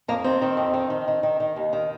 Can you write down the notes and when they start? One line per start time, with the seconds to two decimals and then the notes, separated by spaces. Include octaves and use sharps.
0.08 F2 A#3
0.24 D#3 C4
0.42 D#3
0.57 F2
0.74 D#3
0.90 D#3
1.08 D#3
1.23 D#3
1.40 D#3
1.56 D#2
1.73 D#3